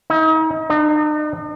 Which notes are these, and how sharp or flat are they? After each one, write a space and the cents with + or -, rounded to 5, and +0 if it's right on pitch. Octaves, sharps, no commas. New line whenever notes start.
D#4 +40
D#4 -45